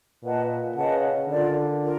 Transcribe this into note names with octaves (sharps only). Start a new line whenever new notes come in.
A#2 B4 D#5 F#5 A5
C#3 B4 D#5 F#5 A5
D3 F4 A#4 D5
F4 A#4